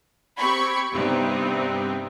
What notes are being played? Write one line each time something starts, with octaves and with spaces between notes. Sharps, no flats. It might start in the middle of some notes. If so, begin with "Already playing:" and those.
C4 G4 B5 C#6 G#6
G2 C3 G3 B3 C4 D#4